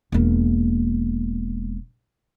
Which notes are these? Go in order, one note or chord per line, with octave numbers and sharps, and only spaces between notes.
E1 A#3